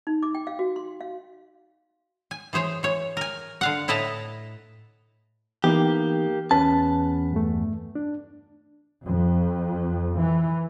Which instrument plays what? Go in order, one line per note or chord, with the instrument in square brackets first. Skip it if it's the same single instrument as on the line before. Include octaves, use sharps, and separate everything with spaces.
[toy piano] D#4
D6
G5
F5
F#4
C6
F5
[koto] G#5
E3 G#4 C5 C#5
E3 C#5
A#4 G#5
D3 F5 F#5
A2 E4 B4 D#5 A5 A#5
[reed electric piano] E3 B3 D#4 [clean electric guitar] A#3 G4
[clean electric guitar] E2 B4 A5 [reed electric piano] C#4
[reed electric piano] G2 A3
D4
[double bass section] F2
E3